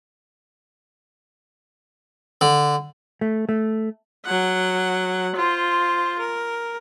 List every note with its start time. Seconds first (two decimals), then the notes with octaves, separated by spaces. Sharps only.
2.41 D3
3.21 A3
3.49 A3
4.25 F#3 F#5
5.36 F4 C5
6.19 A#4